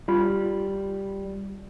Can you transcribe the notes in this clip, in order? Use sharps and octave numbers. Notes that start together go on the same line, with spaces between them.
G3 F4 B5